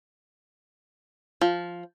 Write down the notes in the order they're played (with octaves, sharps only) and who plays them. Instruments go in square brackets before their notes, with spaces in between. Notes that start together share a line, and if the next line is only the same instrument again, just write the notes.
[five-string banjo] F3